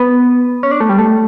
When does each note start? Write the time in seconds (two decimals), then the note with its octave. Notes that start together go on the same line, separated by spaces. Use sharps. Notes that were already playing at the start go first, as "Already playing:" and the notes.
Already playing: B3
0.63 C#4
0.71 D4
0.80 A3
0.89 G3
0.98 A3